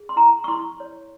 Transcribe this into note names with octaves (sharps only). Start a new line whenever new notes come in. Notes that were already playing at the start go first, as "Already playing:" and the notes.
Already playing: G#4
C6
E4 A#5
C#6
E4 C6
C#5